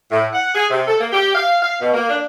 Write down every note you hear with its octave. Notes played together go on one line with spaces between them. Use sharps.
A2
F#5
G#4
C3
A4
A#3
G4
F5
F5
B2
A#3
D4